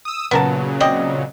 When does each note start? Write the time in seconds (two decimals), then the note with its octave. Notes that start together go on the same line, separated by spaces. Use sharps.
0.05 D#6 E6
0.31 A#2 C#3 F#3 B3 A#4 A5
0.80 C4 D5 D#5